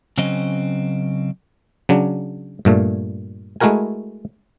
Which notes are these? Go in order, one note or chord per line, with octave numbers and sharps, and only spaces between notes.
C#3 F#3 C4 C#4 D#5
C#3 F#3 D4
G2 A#2 A3
G#3 A3 E4 F#4 A#4 G#5